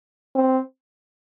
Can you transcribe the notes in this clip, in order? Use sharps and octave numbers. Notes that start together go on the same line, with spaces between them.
C4